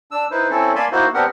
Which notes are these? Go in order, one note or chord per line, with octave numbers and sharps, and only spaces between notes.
D4 E6
D#4 E4 B4 C5
C4 C#4 E4 A4
A#3 D5 G#5 A5 B5 C6
A#3 D#4 E4 F#4 C5
B3 C4 D4 G4 A#4 F#5